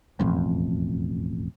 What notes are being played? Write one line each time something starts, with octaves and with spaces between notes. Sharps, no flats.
E1 A1 F2